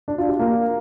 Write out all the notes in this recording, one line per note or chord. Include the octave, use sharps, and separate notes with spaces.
D4
F4
G4
A#3